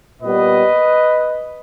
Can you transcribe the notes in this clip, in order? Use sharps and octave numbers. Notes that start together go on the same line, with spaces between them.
A#2 G3 B3 B4 D#5